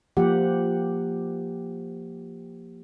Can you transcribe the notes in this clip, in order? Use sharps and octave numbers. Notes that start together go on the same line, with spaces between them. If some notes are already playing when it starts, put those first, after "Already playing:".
F3 A#3 G4 F#5